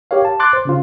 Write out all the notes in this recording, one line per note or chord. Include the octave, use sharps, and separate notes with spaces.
G4 A#4 C#5 F5
A5
C6 D6 F#6 A6
C5
C#3 C#4 F4